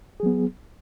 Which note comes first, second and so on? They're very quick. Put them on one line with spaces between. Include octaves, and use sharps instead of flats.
G#4 F#3 B3